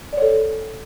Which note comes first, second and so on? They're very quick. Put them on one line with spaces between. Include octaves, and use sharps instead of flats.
D5 C#5 A4